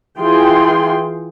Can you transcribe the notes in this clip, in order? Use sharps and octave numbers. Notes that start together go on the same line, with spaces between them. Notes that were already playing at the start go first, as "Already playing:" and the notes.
E3 F4 G#4 G5 C6